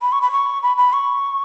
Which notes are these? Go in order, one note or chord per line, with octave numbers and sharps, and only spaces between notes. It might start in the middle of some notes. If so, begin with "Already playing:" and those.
B5
C#6
B5
C#6
B5
B5
C#6